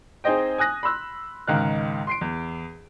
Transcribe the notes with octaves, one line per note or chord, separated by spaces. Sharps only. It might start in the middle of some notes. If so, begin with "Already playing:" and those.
C4 D#4 G#4 C5 D#5 G5
G#5 D#6 F#6 A#6
B5 C6 E6 F#6
C#2 G#2 D#3 A#4 F5 F#6
C6 C7 D7
E2